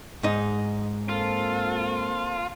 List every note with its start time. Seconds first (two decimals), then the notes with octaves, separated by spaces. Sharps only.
0.23 G#2 D#4
1.09 A#3 C4 F4 A4